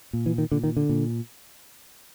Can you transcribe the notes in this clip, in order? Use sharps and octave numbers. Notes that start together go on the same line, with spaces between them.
A#2
E3
D#3
A#2 D3
D#3
D3
A#2